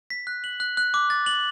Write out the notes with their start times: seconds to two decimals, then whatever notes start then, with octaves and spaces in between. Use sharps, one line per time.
0.10 B6
0.27 F#6
0.44 F#7
0.60 F#6
0.77 F#6
0.94 D6
1.10 A6
1.26 F#7